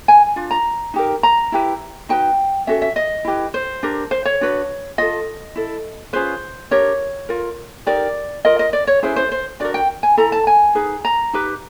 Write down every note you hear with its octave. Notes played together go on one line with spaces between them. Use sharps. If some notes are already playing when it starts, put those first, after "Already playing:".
G#5
D4 F4
A#5
D#4 G4 A#4
A#5
E4 G4 B4
D#4 F#4 B4 G5
C#4 F#4 A4 E5
E5
D#5
E4 G4 B4
C5
D4 G4 A#4
C5
C#5
D4 F#4 B4
F4 A4 D#5
E4 A4
C#4 F4 G#4 B4 C5
D4 G4 A#4 C#5
F4 A#4
D#4 G4 A#4 D5
F4 A#4 D#5
D#5
D5
C#5
C#4 E4 G#4 B4 C5
C5
C5
D4 F#4 A#4 D5
G5
G#5
E4 A4 A#5
A5
G#5
D#4 G#4 B4
A#5
D#4 G4 B4